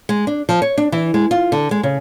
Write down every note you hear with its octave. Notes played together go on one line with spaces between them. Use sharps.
G#3
D4
F3
C#5
D4
E3
G#3
F4
D3
G#3
C#3